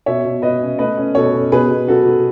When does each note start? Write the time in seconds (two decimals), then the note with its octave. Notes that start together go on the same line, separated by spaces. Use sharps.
0.06 B2 C#5 E5
0.24 B2
0.42 B2 B4 D#5
0.61 C#4
0.78 A3 B4 D#5
0.97 C#4
1.15 B2 A4 C#5
1.34 C#4
1.52 B2 G#4 B4
1.70 B2
1.88 F#3 F#4 A4
2.06 F#3